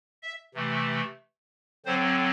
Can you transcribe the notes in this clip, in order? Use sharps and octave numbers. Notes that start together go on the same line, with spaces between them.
E5
C3 E3 A3
D3 F#3 C4 C5